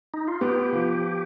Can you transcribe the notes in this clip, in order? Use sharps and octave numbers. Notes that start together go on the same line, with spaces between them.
D#4
F4
B3 G4
F3